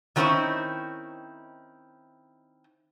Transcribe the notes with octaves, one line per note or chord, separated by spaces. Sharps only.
D#3 F#3 C4 C#4 D#4 E4